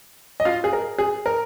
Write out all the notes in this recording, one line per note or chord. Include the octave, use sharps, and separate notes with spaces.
D#5
F4 F5
G#4
A#4
G#4
A#4